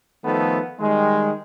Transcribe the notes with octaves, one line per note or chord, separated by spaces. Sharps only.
D#3 F3 A3 B3 A4
D#3 G3 G#3